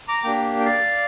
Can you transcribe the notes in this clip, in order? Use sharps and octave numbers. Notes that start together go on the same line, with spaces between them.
A#5 D6
A#3 D4 G4 G5 A#5
G5
D5 F5